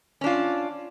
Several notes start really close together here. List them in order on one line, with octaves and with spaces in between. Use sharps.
C#4 D4 F4